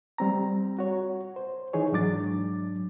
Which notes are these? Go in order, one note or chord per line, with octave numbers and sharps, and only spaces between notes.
G3 C4 A#5
F#4 C#5
C5
E3 D#4 G#4 C#5
G#2 F#3 D4 D6 A6